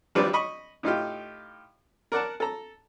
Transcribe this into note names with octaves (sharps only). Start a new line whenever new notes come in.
G#1 F3 G3 D4 B4 D5
D#5 B5 C#6
A2 D#4 F4 G4
A#4 D5 F#5 A5
A4 A#5